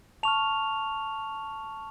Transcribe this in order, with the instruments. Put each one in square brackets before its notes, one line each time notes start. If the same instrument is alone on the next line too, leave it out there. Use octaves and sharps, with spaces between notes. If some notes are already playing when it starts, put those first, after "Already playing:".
[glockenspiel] A5 C#6 F6 F7